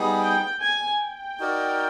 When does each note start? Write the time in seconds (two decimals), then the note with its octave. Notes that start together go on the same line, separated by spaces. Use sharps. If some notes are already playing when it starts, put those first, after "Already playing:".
Already playing: G3 B3 D#4 G#4
0.20 G5
0.60 G#5
1.00 G5
1.40 D#4 F#4 A#4 D5